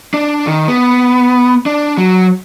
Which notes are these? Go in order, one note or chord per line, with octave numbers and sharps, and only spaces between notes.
D4
D#3
B3
D4
F#3